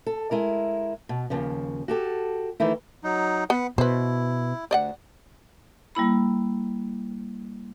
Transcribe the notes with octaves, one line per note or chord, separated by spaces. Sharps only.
A4
G#3 E4 A#4
B2
D#2 C#3 F3
F#4 G4 A4
D#3 E3 A3 D#4 E4
F#3 D#4
B3 B4 F#5
B2 E4 B4 C5
D2 D5 D#5 F#5
G3 A#3 E4 B5